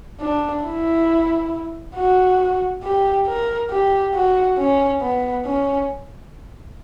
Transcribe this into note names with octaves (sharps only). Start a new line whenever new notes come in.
D4
E4
F#4
G4
A#4
G4
F#4
C#4
B3
C#4